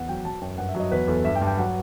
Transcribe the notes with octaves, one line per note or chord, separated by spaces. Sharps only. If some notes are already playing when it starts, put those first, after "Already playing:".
Already playing: E2 F#5
F#3 G5
F#3 A5
F#2 G5
G2 F#5
E5
F#3
D#5
E2 B4
E2 A4
G2 E5
G5
G2
G5
F#3 F#5